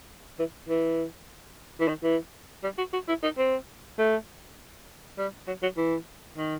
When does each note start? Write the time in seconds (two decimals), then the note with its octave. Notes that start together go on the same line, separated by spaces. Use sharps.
0.39 E3
0.68 E3
1.80 E3
1.88 D#3
2.03 E3
2.63 G3
2.78 F#4
2.93 F#4
3.08 E4
3.23 D#4
3.37 C4
3.98 A3
5.18 G3
5.47 F#3
5.62 F#3
5.77 E3
6.37 D#3